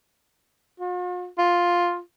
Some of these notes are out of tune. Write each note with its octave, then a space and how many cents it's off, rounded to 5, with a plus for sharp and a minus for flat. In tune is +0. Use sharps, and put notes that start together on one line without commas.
F4 +45
F4 +5